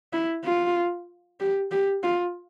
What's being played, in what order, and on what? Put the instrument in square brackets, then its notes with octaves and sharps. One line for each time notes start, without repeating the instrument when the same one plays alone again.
[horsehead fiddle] E4
F4
G4
G4
F4